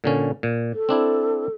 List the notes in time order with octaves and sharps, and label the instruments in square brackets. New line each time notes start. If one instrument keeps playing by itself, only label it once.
[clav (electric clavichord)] A#2 D3 C#4
A#2
[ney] A4
[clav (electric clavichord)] C4 D4 E4